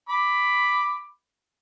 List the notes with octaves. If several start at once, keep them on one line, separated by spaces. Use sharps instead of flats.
B5 D6